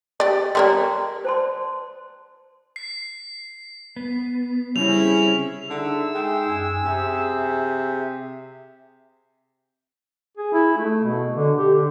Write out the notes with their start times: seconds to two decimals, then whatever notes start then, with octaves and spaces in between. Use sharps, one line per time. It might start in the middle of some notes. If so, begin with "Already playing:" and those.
0.20 G4 D5
0.55 G3 A#4 C#5 D5 A#5 C6
1.25 C5 A5 C6
2.76 C7
3.96 B3
4.76 C#3 G3 C4 C#4 E4 F7
5.70 D3 D#4 G#4 E5 E6
6.15 G#3 G5
6.47 F#2 G#5
6.85 C3 G#4 E5
10.37 G#4
10.53 E4
10.77 A3
11.03 B2
11.36 D3
11.57 G4
11.74 D3